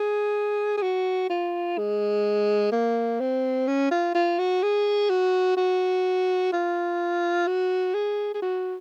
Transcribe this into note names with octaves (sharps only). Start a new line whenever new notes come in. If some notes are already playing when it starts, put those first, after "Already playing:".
Already playing: G#4
G#4
F#4
F4
G#3
A#3
C4
C#4
F4
F4
F#4
G#4
F#4
F#4
F4
F#4
G#4
G#4
F#4